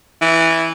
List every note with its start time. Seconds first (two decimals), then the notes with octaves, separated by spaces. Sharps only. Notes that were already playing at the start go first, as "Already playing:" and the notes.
0.21 E3